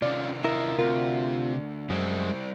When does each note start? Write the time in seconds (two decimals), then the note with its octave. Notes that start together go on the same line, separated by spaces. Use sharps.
0.02 C3 D#3 C#4 F4 D5
0.44 E4 F4 A#4 D#5
0.79 D2 C3 F4 A#4
1.90 F#2 G3 G#3 C4 E4